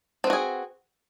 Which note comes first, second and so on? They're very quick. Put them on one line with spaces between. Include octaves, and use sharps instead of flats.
C4 B4 F#4 G#4